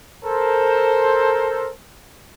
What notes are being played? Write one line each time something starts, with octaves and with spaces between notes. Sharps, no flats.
A4 A#4 C5